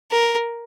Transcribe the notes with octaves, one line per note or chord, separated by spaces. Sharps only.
A#4